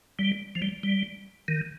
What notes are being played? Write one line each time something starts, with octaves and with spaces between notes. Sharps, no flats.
G3
F3
G3
G3
D#3